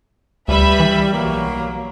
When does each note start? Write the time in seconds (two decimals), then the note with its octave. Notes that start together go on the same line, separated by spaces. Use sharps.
0.48 D2 G3 B4 E5 B5
0.80 E3
1.13 B1 F#3 A#3